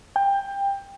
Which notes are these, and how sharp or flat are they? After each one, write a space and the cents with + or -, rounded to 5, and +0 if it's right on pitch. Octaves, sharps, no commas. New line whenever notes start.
G5 +20